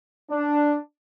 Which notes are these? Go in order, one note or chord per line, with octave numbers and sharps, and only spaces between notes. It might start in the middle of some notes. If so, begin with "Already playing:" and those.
D4